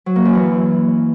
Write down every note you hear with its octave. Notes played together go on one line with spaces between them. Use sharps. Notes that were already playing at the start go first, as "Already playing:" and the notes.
F#3
A#3
F#2
E3